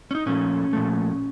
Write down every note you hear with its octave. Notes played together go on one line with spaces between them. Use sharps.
C#4
D#4
A#2 F3 A3 C#4
A#2 F3 A3